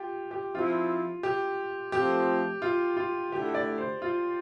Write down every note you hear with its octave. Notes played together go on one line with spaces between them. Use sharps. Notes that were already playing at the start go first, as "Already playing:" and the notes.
Already playing: F4 G4
G4
F3 C4 E4 F4
G4
F3 A3 C4 G4
F4
F4
D3 A3 E4 G4
D5
C5
F4